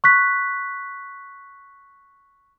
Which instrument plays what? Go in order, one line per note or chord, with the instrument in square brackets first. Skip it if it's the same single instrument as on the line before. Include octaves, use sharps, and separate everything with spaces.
[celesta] C#6 F#6 B6